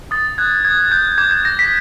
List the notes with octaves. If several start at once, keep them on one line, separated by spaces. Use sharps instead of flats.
D#6 A6
F#6 G#6
D#6 G#6
F#6 G6
D6 G#6
G6
G6 A#6
B6